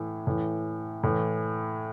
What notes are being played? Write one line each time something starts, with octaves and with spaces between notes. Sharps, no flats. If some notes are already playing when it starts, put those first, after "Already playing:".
Already playing: A2 E3
A2 E3
A2 E3